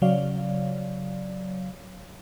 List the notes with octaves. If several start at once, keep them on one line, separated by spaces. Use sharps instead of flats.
C#3 F#3 C#5 D5 F5